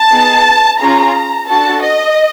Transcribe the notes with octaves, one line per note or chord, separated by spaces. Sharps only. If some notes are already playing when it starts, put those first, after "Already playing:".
Already playing: A5
B3 D#4 G#4
C#4 F4 G#4 A#5
D4 F#4 A4 A5
D#5